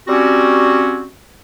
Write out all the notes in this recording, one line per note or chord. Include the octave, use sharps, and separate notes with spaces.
G3 C4 C#4 F#4